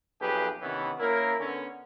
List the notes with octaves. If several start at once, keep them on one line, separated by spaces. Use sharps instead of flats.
B1 F2 G4 G#4 B4
C3 D#3 E3 B3 C#4
A#3 C#4 E4 A#4
D3 B3 C#4